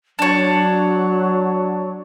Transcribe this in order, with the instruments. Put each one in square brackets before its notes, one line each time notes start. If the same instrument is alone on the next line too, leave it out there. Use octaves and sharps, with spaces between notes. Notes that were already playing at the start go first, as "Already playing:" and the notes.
[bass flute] F#3 [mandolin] D4 C#5